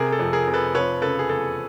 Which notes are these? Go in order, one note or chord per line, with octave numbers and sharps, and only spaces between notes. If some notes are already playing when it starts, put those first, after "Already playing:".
Already playing: C3 G#4 A#4
A4
F2
G#4 A#4
F1
A4 B4
F3 B4 C#5
C#3 A4 B4
G#4
E2 A4